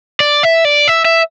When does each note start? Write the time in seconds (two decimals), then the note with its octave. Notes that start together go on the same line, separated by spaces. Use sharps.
0.20 D5
0.43 E5
0.65 D5
0.88 E5
1.05 E5